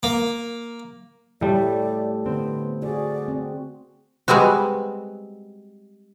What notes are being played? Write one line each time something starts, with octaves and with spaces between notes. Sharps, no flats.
A#3
A2 G3 A3 D5
D3 B3 C4
F#4 G#4 D5
C4
G3 G#3 B3 C4 F#4